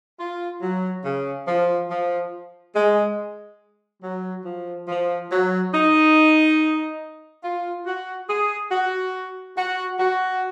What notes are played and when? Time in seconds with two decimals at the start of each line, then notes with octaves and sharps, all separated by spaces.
0.18 F4
0.61 F#3
1.03 C#3
1.46 F3
1.89 F3
2.74 G#3
4.02 F#3
4.44 F3
4.87 F3
5.30 F#3
5.72 D#4
7.43 F4
7.85 F#4
8.28 G#4
8.71 F#4
9.56 F#4
9.98 F#4